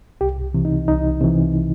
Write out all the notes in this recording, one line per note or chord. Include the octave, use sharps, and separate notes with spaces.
C2 G4
C3 E3
D#4
C2 D#4
C3 E3